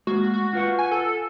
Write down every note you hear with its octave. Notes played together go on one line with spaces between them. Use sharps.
G#3 A#3 F#4
F#4
F4 B4 F#5
G#5
A4